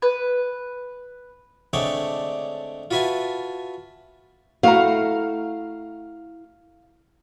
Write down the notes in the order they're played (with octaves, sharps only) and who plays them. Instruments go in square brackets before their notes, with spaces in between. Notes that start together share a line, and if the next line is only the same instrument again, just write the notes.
[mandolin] B4
[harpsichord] D3 G#3 A3 C4 C#5 D5
F4 F#4 B4 E5 G#5 A5
[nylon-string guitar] A3 E4 F#4 [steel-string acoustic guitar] F5 A#5